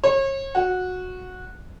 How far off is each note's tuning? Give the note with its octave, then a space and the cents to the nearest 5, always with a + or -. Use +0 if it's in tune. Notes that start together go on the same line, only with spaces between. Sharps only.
C#5 -35
F#4 -15